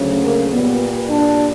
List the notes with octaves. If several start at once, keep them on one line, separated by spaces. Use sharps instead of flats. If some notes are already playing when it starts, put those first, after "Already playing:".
Already playing: D2 C#3 F#3
A#3
A#2 G3 B3
D4